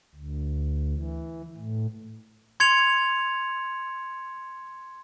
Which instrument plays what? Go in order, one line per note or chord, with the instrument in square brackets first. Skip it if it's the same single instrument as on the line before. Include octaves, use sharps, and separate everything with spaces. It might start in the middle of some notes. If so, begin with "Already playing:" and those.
[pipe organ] D2
E3
A2
[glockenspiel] C6 G#6 C#7 F7